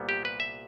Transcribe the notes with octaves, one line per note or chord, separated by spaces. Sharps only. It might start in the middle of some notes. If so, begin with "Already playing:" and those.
Already playing: C2 A#2 G3 B3
G4
B4
E5